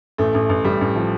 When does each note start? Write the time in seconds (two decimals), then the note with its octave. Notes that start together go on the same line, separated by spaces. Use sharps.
0.18 A1 A3
0.34 A1
0.49 A1
0.65 A1 G3
0.81 A1
0.96 F3